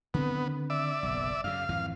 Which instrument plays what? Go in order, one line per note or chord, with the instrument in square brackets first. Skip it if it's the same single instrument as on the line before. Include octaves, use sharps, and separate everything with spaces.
[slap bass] D3 D#3 C4 [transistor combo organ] B3
[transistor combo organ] D5 E5
[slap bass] F#1 B1
[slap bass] F#2 C#3 [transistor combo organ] F5
[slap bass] G#1 F2 E3